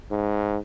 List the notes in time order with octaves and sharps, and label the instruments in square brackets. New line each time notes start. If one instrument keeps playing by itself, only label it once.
[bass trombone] G#2